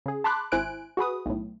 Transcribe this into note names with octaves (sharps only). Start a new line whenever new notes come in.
C#3 G#4
A5 B5 C6 D6 F#6
G#1 E4 C5 G#5 F#6 D7
F#4 G#4 B4 D#6
B1 A2